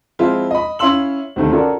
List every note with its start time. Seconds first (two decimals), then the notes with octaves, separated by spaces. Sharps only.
0.19 F3 G#3 C4 E4 F4
0.51 D#5 B5
0.79 C#4 E4 F5 C6 E6 F#7
1.36 D2 C3 D#3 A3
1.50 C#4 F4 F#4 A4 A#4 D5